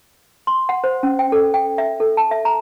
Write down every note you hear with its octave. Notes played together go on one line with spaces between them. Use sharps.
C6
F#5
C5
C#4
G5
A4
G5
E5
A4
A5
E5
A#5